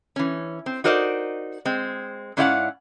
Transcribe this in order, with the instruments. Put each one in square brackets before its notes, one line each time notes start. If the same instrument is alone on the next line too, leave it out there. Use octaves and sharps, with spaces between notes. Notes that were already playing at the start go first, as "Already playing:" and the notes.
[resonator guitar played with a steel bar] E3 C#4
C4
D#4 F#4 A#4 C5 D5 D#5
G#3 C4
G#2 C#4 E4 D5 F5 F#5